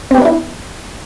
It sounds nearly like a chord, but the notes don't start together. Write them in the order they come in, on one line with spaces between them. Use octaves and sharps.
C4 G4 B3 D4 E4